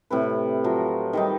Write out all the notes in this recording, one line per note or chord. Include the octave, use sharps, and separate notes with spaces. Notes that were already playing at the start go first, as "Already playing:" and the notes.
A2 C3 B4
F3 F#3
D#3 G3 D#4